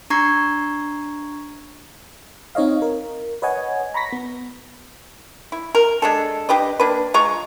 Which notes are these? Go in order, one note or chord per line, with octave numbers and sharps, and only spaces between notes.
D4 A#5 C#6 G#6 C7
C4 D#4 C#5 D#5 F5
A#4
B4 C#5 D#5 F#5 G#5
A#5 B5 C#6 A#6 B6
B3
E4
A#4
G#3 D4 A4
D4 G4 B4 D#5
A#3 D4 B4
G#3 F4 A#5 C#6